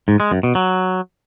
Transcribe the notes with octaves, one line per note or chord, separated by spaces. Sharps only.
G#2
G#3
F#2
B2
F#3